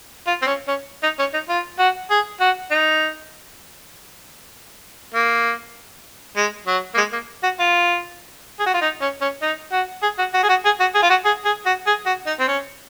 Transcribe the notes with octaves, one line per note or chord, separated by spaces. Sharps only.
F4
C4
C#4
C#4
D#4
C#4
D#4
F4
F#4
G#4
F#4
D#4
A#3
G#3
F#3
A#3
G#3
A#3
F#4
F4
G#4
F#4
F4
D#4
C#4
C#4
D#4
F#4
G#4
F#4
F#4
G#4
F#4
G#4
F#4
G#4
F4
F#4
G#4
G#4
F#4
G#4
F#4
D#4
C4
C#4